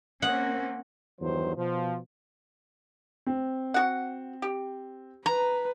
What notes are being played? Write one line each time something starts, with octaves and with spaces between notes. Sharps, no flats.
A#3 C4 C#4 F#5
E2 G2 D#3 F#3 C5
B2 F3
C4
F#4 F#5
G4
B4 A#5